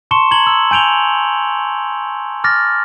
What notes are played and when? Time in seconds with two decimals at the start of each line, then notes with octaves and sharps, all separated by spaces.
0.11 A5 C6 C#6 C#7 E7 G7
0.31 A#5 G#6 F#7 G7
0.47 E6
0.71 G#5 G6 D7 F7 G7
2.44 D6 F6 A6 A#6